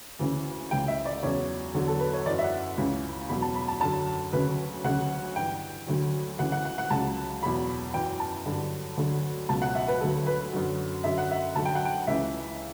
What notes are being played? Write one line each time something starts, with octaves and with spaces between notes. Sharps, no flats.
D2 C#3 E3
C#2 C#3 E3 G5
E5
D5
E2 C#3 F#3 C#5
E2 D3 F#3
A4
B4
C#5
F#2 E3 D5
E5
F#5
C#2 C#3 E3
E2 B2 F#3 B5
A5
B5
A5
F#2 D3 F#3 A5
D2 C#3 F#3 B4
D2 C#3 F#3 F#5
G2 E3 G5
D2 D3 F#3
D2 C#3 E3 F#5
F#5
F#5
F#5
C#2 C#3 F#3 A5
E2 B2 F#3 B5
F#2 E3 G5
A5
G2 D3 F#3
D2 D3 F#3
C#2 B2 F#3 A5
F#5
E5
B4
D2 D3 F#3 A4
B4
F#2 D3 F#3
F#2 D3 F#3 E5
F#5
E5
D2 D3 F#3 A5
G5
F#5
G5
C#2 C#3 E3 E5